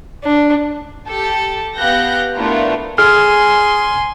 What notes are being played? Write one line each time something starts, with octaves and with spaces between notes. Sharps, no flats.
D4
G4 A4 A5
B3 G4 F5 F#6 G6 A#6
A3 B3 D4 E4 F4 A#4
G#4 G#5 C6 F6